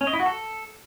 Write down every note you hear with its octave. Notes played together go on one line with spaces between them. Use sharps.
C#4
D#5
E4
F#4
A4